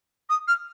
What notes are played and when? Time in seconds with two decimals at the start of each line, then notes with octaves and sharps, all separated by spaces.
0.29 D#6
0.47 F6